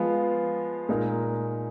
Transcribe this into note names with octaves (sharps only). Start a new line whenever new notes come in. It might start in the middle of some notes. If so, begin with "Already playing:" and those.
Already playing: F3 G#3 B3 F4
A#2 G#3 D#4 A#4